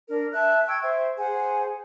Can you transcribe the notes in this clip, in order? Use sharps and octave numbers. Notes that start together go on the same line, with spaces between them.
D4 A#4
E5 A5 F#6
G5 C#6 E6 G#6
C5 E5
G#4 C5 F#5 G#5